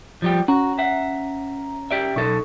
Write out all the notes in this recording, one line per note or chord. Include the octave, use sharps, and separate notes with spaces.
F3 G3 G4
C#4 F#4 A#5
E5 F#5
G4 D5 E5
B1 D#4 A4 C#6